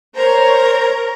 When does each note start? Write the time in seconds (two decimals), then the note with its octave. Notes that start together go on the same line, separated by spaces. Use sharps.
0.14 A#4 C5 C#5 A#5